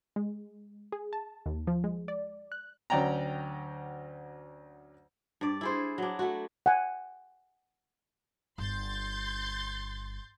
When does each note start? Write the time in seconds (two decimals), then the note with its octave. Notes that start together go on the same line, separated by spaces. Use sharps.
0.16 G#3
0.92 G#4
1.13 A5
1.46 D#2
1.67 F3
1.84 G#3
2.08 D5
2.52 F#6
2.90 D2 F#3 C#4 D5 G5 A#5
5.41 G2 D5
5.61 E4 G#4 C5
5.98 F#3 D4
6.19 A3 F#4
6.66 F#5 G#5
8.58 G1 C6 G6 A6